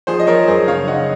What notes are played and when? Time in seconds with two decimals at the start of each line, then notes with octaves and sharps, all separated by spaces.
0.07 F3 G#4 C5
0.20 D#5
0.27 F3 A#4 C#5
0.48 F#2 G#4 C5
0.68 C#3 C#5 F5
0.87 C#3 D#5 F#5